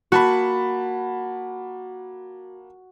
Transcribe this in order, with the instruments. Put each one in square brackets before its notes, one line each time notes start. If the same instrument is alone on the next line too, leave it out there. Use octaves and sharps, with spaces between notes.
[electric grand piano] A#3 A5 B5 [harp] F#4